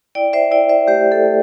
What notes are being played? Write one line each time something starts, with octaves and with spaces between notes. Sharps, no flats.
E4 D5 G5
C5 E5
E4 D5 G5
C5 E5
A3 G4 C5
A4
A3